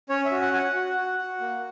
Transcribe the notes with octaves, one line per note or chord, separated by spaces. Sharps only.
C#4 C#5
E5
F#4
F#5
F#4 G#5
F#5
F#4
F#4
F#4
A#3